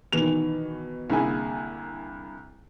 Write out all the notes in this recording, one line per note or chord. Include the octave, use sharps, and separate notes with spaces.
B2 D#3 E3 F7
C2 D3 A#3 E4 G#4 G#5